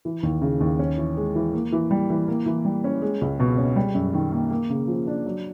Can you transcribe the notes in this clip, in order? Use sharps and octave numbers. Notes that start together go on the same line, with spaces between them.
E3
D#2
C#3
D#2
C#4
E3
G#3
E3
A#3
E3
G3
E3
A#3
E3
G3
C#4
G#3
C#2
B2
C#4
G3
F#2
D#3
A#3
A#3
C#3
F3
D4
F#3